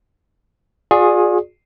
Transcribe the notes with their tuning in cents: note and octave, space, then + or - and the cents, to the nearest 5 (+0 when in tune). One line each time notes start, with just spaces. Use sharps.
F4 +40 G#4 +0 D5 +10